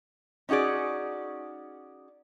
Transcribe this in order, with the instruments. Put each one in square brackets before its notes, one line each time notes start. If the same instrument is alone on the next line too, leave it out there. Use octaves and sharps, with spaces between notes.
[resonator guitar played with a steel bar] C#4 D#4 F#4 G#4 D5